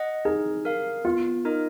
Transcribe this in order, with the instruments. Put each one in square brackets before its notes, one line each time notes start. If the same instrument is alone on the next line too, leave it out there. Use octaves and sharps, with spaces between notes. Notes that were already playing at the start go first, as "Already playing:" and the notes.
Already playing: [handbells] D#5 F#5
[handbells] D#4 [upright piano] G#4
[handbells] A#4 F5
[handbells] B3 [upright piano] F4
[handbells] D#4 A#4 D#5